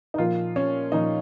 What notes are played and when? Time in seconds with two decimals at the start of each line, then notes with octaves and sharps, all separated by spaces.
0.14 D#4
0.18 A#2 F3 F4
0.56 C#4
0.92 A#2 F3 D#4